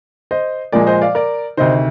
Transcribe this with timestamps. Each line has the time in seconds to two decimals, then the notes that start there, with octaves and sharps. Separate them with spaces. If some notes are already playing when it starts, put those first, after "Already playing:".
0.31 C5 D#5
0.72 A#2 F3 G#3 A#4 D5
0.87 C5 D#5
1.02 D5 F5
1.15 A#4 D5
1.57 D2 C3 D#3 C5 D#5